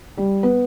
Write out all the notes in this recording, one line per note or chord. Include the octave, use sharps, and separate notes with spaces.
G3
B3